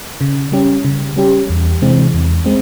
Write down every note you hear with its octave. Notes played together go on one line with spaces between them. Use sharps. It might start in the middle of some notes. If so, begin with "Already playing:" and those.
C#3
G3 C#4 G4
C#3
G3 C#4 G4
E2
C3 E3 G#3 C4
E2
G#3 C4